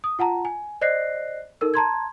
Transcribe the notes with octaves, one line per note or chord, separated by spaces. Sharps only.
D#6
F4 F#5 A5 A#5
G#5
C5 D5 D#5 F#6 A#6 C7
D#4 A4 A#4 E6
A5 A#5 C6 G#6